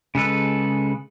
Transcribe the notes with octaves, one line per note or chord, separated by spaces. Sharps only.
C#3 G#3 A4 B4